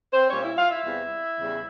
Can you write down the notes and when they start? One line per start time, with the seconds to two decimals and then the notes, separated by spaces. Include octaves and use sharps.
0.12 C4 C5
0.29 A#2 G3 C#4 C#5
0.43 E4 E5
0.56 F4 F5
0.70 E4 E5
0.84 E2 C3 E3 G3
1.38 E2 C#3 G3